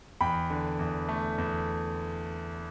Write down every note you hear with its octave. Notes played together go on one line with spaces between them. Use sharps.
E2 G5 B5
D3
E2
A3
E2